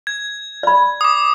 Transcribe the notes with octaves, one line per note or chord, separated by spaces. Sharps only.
G#6
D5 B5
D6 D#6